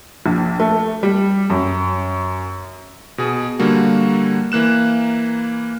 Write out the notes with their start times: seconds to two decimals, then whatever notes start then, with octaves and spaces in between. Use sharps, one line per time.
0.26 A#1
0.60 A3
1.03 G3
1.50 F#2
3.18 B2 G#4
3.59 D3 G3 A#3 F#4
4.52 E3 A#3 F#6 E7